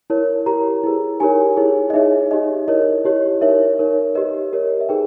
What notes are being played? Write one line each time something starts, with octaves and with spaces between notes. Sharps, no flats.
E4 A#4 C#5
E4 G4 A#4 C#5 A#5
E4 G#4 B4
D#4 G4 A#4 C#5 G#5
E4 G#4 C#5
D#5
D#4 G#4 C#5 E5
D#4 G4 C#5 D#5
E4 A#4 C#5 D#5
E4 G4 C#5
D#4 A#4 C#5 E5
D#4 A#4 C#5
G4 B4 D#5
G4 A#4 C#5
D#5
E5
D#4 G#4 B4 G5